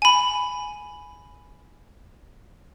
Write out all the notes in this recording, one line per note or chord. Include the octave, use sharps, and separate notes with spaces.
G#5 B5